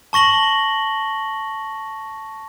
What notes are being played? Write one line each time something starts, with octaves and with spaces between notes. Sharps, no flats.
A5 C#6 A#6 F#7 G7